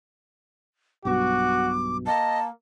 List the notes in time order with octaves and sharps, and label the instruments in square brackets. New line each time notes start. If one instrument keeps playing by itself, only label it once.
[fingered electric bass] B1 G2 B2 [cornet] F#4 [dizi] D6
[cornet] A#3 [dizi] D#5 [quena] A5